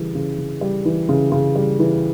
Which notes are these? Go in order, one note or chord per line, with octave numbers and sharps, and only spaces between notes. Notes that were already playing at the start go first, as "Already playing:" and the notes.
Already playing: C#3 E3 G3
C#3
C#3
G3
E3
C#3
C#3
G3
E3